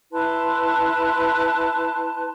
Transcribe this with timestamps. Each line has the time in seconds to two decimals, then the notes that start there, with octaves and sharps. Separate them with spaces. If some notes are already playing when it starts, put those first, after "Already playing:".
0.12 E4 B4 A5 C6